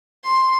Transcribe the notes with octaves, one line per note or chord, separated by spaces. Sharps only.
C6